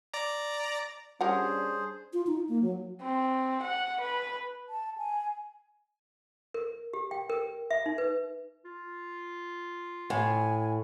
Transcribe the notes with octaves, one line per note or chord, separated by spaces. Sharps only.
D5 A#5
G3 C#4 D4 G4 G#4 A#4 C5 F#5
F4
D#4
A#3
F#3
C4
F#5
B4
A5
G#5
A#4
G4
G5
A#4
E5
D#4
B4
F4
A2 G#5